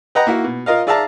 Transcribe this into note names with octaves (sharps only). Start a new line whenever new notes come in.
B4 D#5 F#5 G5 A#5
A#3 E4 F#4
B2
F4 A#4 D#5 F5
G#4 D5 E5 F5 A5 A#5